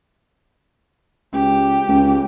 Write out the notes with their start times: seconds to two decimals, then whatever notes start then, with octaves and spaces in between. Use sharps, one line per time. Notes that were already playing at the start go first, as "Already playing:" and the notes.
1.33 C#2 G4
1.88 C#2